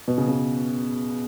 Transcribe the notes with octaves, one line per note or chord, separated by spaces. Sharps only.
B2
C#3
C#3